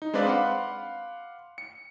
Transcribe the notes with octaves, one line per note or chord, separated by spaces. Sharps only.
D#4
G#3 C4 D4 B4 D5 F5
F5 F#5 B5 C6 D6
C#7